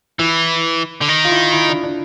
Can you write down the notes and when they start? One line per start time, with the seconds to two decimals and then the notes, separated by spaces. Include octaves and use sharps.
0.19 E3 E4
1.01 D3
1.08 D#3
1.25 F4
1.31 E4
1.53 E4
1.69 D4
1.83 D4